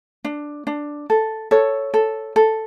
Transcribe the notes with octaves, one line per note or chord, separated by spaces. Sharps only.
D4
D4
A4
A4 C#5
A4
A4